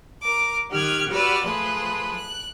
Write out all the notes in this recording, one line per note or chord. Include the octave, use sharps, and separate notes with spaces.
A#4 D6
D#3 G4 F6 F#6 G#6
F#4 G4 B4 D5 E6 F6
F3 A3 G#4 B4 A5 C6
F#6